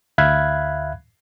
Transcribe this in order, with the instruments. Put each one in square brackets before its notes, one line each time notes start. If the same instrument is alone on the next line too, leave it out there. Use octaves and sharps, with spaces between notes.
[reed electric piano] D2 E5 F5 B5 F#6 G#6